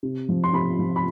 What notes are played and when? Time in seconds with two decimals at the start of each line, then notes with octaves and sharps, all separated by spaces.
0.03 C3
0.29 F3
0.44 C6
0.53 C3 B5
0.79 F3
0.96 B5